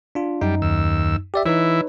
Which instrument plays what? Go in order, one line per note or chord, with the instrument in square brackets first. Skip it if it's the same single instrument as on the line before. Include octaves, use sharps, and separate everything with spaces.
[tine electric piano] D4 F4
[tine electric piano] F#2 D#4 [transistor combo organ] G3
[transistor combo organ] D#2 E6
[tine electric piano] G4 D5 E5
[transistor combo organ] E3 E4 [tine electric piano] D#4 B4 C#5